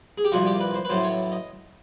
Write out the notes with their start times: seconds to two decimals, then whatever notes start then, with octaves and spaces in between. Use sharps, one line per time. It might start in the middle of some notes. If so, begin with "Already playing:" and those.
0.18 G#4
0.25 G4
0.32 C2 A#2 F3 F#4
0.46 G4
0.60 B4
0.75 C5
0.85 B4
0.89 A1 A2 F#3 C5
1.03 C#5
1.32 D#5